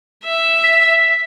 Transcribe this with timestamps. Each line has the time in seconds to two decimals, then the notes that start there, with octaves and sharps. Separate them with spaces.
0.24 E5
0.64 B6